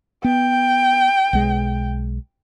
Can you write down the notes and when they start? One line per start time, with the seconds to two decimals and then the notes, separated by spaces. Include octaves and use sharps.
0.24 B3 G5
1.33 B1 G#3